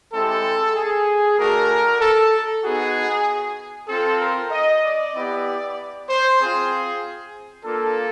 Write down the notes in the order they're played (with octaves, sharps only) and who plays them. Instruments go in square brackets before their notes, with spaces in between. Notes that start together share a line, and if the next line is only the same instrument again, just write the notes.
[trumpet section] G#3 C4 E4 G4 A4
G#4
A3 D4 F#4 A#4
A4
B3 D#4 F#4 G#4
C4 F4 A4
A#4
D#5
D5
B3 E4 G4
C5
C4 F4 G#4
A#3 D4 F4 A4